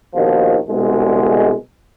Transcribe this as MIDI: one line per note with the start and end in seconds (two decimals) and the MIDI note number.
0.14 0.56 34
0.14 0.56 39
0.14 0.56 47
0.14 0.56 51
0.14 0.56 53
0.69 1.52 36
0.69 1.52 47
0.69 1.52 50
0.69 1.52 56